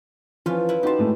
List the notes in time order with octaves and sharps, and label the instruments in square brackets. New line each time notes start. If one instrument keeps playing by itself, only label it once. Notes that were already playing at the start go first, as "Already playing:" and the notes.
[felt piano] E3 F3 [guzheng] C#4 F4 B4
[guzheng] E4 B4
[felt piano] D#4 F#4 C6 [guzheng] G4 A5
[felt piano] A2 G#3 A3